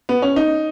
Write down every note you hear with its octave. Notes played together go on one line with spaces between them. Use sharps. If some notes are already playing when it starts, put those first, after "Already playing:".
B3
C#4
D#4